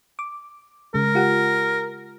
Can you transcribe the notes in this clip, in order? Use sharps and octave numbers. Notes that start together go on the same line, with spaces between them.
D6
C#3 G#3 A#4
F4 G4 F#5